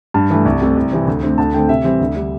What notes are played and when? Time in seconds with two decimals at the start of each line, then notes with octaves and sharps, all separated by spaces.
0.14 G2 A5
0.30 E3 A3
0.45 C2
0.62 C3 A3
0.77 C2
0.91 C3 E3 C4
1.07 D2
1.23 D3 A3 C4
1.38 D2 A5
1.54 D3 A3 C4 G5
1.69 C3 E5
1.84 E3 G3 C4
2.00 D2
2.16 D3 G3